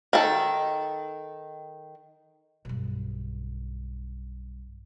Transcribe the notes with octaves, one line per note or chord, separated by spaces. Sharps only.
D#3 A4
B1 G2